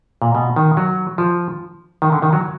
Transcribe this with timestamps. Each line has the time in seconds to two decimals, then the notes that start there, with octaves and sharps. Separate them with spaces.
0.22 A#2
0.35 B2
0.56 D#3
0.77 F#3
1.18 F3
2.02 D#3
2.12 D3
2.22 D#3
2.33 F#3